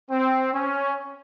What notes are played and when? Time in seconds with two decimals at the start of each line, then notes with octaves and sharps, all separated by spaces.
0.11 C4
0.54 C#4